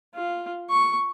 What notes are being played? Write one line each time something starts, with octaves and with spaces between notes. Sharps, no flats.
F4
C#6